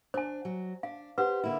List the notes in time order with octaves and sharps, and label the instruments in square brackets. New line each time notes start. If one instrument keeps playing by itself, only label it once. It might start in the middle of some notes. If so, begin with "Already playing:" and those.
[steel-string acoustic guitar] D4 [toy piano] C5 G#5
[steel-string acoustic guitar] F#3
[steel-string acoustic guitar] D4 [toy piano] F5
[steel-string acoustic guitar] G4 C5 [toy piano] B4 F#5
[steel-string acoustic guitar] D3 A#3 E4